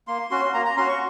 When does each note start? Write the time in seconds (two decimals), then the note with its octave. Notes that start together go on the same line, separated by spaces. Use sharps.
0.07 A#3 C6
0.31 C#4 F#4 C6
0.54 A#3 A#5
0.65 A#5
0.77 C#4 F#4 C6
0.89 C#6